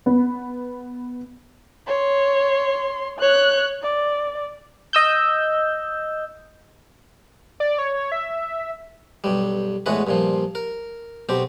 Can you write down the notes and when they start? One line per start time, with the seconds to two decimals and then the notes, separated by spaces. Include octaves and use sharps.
0.06 B3
1.87 C#5 C6
3.19 C#5 F#6
3.83 D5
4.93 D#5 E6 G6
7.60 D5
7.78 C#5
8.12 E5
9.24 B1 G2 G3
9.86 E2 A2 G#3 F#4 B4
10.07 G2 A#2 F3
10.55 A#4
11.29 B1 B2 C4 G4